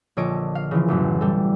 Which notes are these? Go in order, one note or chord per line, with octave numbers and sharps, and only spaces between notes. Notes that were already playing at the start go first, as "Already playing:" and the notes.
A#1 D3 C#5 D#5 A5 D7
F5
C#3 E3 F3
E1 A1 F#2
G3 A4